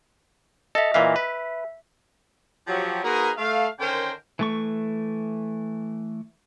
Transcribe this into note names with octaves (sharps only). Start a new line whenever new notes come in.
A4 D#5 E5
A#2 E3 E5 F5
B4
F3 F#3 G4
A#3 D#4 F#4 G#4 A#4 B4
A3 F5
D3 D#3 C#4 A#4 C5 G5
E3 A3 C#6